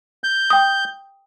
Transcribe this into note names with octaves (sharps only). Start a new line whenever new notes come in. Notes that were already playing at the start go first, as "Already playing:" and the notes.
G6
G5 D#6